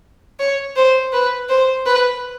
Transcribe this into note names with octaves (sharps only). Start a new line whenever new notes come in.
C#5
C5
B4
C5
B4